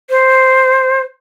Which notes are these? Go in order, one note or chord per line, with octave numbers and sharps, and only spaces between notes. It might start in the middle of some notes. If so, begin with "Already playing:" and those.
C5